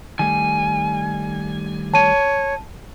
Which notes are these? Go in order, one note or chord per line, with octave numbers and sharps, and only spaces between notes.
D#3 G3 A3 G#5
C#5 A5 D#7